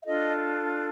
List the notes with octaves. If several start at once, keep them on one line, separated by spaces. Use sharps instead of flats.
E5
D4 F4 A4 D#5